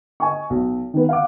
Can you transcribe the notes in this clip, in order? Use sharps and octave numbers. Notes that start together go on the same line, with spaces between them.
D#5 G#5 C#6
B1
D#3 B3
F5 F#5 D6